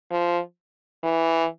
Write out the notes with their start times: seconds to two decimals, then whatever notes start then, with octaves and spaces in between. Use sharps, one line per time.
0.11 F3
1.03 E3